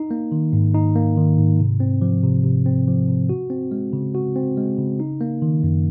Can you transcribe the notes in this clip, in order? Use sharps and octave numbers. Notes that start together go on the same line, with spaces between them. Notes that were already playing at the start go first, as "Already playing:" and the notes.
Already playing: D#4
A#3
D#3
G#2
D#4
A#3
D#3
G#2
C3
C4
F3
C3
C3
C4
F3
C3
F#4
C4
G#3
C#3
F#4
C4
G#3
C#3
D#4
A#3
D#3
F#2